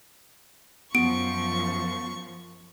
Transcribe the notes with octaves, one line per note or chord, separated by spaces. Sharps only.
F#2 F3 B3 C#6 D7